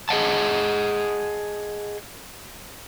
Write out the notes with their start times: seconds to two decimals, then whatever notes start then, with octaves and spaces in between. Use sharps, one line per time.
0.09 G#4 D#5 F#5 A5